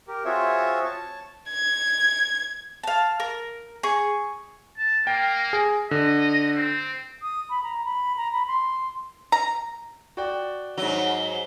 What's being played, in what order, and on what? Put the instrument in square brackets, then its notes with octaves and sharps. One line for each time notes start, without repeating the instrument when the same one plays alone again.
[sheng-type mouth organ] G4 A#4
C4 F4 F#4 G#4 C#5 E5
C#5 A5 C#6
[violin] G#6
[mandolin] F5 A5
A#4
G#4 C#6
[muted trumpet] A5
[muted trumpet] A#3 [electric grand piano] G5
[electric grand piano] G#4
[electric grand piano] D3 [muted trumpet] D#5
[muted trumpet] C4
[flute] D#6
B5
A#5
B5
A#5
B5
C6
[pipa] A#5
[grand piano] F#4 D5 G5
[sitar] G#2 F#3 [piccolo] G7